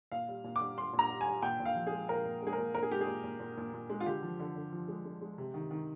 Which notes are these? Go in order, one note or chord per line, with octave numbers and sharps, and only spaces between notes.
A#2 F5
G3
A#2
D6
G3
G3 C6
A#2
A#5
G3
G#5
G3
A#2 G5
A#2
F5
F3
G#4
G#3
A#2 A#4
A#2
G#3 G#4
A#4
A#2
A#2 A#4
G#4
G#3 G4
G#4
A#2
A#2
A#2
A#2
A#2
G#3
F4
D3 G4
F3
D3
D3
F3
G#3
G#3
G#3
C3
D#3
D#3